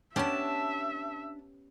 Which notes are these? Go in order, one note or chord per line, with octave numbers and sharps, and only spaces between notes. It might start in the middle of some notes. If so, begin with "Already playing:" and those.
B3 C#4 D4 G4 E5 A5